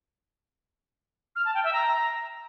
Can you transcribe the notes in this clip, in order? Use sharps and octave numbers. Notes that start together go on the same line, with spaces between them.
F6
A5
G5
E5
A#5